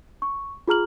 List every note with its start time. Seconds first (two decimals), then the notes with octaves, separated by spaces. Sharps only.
0.22 C#6
0.68 F4 G#4 A#5 F6 F#7